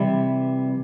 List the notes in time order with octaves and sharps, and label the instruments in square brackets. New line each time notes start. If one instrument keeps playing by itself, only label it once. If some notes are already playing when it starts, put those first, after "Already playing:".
Already playing: [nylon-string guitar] C3 E3 G3